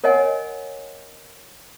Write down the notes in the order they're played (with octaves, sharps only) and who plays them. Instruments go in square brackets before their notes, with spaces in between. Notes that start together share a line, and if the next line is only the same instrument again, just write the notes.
[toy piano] A#4 C#5 D#5 F#5 G#5